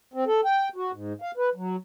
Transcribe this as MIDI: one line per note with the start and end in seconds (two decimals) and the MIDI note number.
0.14 0.24 60
0.27 0.41 69
0.45 0.69 79
0.76 0.91 66
0.92 1.13 44
1.22 1.31 77
1.37 1.50 71
1.55 1.76 54